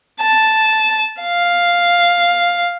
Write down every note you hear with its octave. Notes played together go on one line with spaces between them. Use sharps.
A5
F5